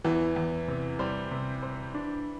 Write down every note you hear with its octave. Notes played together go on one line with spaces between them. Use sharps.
E2 E3
E2
C3
G3 C5
C3
C5
D4